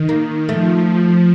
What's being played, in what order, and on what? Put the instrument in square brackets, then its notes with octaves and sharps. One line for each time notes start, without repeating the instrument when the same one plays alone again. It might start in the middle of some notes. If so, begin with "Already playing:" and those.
Already playing: [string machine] D#3
[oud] A#3
[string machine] F3 [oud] A3